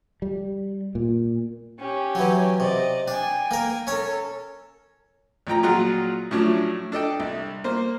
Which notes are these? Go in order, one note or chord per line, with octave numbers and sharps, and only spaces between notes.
G3
A#2
C#4 G4
E3 F#3
C3 D5 D#5
D4 G5 G#5
A#3 A#4
C#4 A4 A#4 C#5
A1 F3 G5 A#5
A#2 F#3 F4 G#4 F#5 A#5
A2 F3 F#3 C#4 D4
D4 A4 D#5 G5
C2
A#3 C5